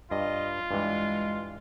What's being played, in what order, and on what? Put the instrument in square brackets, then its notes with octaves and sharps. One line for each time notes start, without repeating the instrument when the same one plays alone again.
[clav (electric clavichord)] G2 [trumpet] F4 [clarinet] D#5
[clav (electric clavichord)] G2 E3 [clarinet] G#3